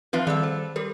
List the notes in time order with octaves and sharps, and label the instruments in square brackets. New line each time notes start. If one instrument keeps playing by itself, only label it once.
[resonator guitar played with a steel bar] F3 F4 B4 [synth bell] C4 E5 F5
[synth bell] D#3 D5 F#6 [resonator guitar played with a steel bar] G3 A4
[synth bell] C5
[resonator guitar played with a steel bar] G3 [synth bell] G4 A4 A#4